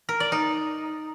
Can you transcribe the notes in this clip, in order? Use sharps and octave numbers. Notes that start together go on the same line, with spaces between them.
A#4
D5
D#4